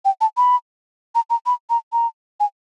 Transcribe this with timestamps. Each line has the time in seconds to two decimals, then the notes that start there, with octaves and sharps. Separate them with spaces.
0.05 G5
0.21 A5
0.37 B5
1.15 A#5
1.30 A#5
1.46 B5
1.70 A#5
1.93 A#5
2.40 G#5